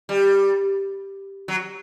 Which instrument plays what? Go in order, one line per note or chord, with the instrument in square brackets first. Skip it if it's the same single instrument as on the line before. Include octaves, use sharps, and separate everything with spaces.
[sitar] G3
F#3